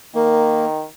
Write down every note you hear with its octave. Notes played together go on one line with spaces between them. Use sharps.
D#3 A#3